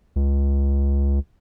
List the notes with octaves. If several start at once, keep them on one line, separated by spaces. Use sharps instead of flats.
C#2